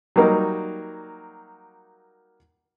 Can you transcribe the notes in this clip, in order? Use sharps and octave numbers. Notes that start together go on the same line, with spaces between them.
F#3 G3 A#3 D#4